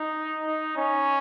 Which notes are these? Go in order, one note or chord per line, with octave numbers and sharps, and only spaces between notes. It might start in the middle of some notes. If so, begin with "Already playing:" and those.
Already playing: D#4
D#4
C#4